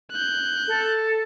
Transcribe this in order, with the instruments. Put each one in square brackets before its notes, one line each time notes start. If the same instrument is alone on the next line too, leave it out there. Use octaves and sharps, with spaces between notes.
[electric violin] F#6 G6
[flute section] A4